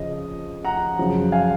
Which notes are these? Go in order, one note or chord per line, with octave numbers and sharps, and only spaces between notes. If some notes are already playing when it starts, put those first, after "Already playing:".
Already playing: F2 C#3 F3 D#5
F#5 A#5
F#2 C#3 F3
F5 G#5